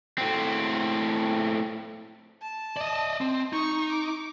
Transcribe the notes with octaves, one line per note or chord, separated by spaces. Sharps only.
A2 C4
A5
D5 D#5
C4
D#4 C#6
D6